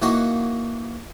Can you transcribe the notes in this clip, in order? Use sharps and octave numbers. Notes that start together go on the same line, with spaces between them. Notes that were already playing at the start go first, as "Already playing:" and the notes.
E3 A#3 D#4 F#4 F#5